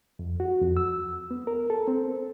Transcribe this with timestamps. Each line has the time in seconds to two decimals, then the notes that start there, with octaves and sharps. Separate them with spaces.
0.19 F2
0.40 F#4
0.62 F2
0.77 E6
1.31 B3
1.47 A#4
1.70 A4
1.88 C4